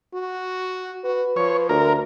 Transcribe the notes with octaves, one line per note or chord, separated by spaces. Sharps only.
F#4
F#4 B4
F3 C#5
D2 A#4